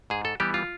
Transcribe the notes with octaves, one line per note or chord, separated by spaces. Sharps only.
G#2 G#4
A4
E3 G3 B3 G4
F4